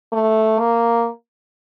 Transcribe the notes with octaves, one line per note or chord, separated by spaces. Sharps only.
A3
A#3